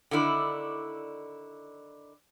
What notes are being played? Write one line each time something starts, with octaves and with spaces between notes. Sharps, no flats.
D3 D#3 E4 D5